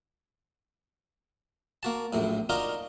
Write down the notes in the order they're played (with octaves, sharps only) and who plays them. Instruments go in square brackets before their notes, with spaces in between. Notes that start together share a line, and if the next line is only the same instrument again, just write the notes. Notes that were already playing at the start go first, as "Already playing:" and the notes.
[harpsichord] A#3 F#4 A5
A#1 F#2 A2
D4 D#4 F4 F#4 A#4